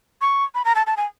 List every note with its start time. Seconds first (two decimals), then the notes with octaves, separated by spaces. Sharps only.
0.22 C#6
0.55 B5
0.65 A#5
0.76 A5
0.87 A5
0.97 G#5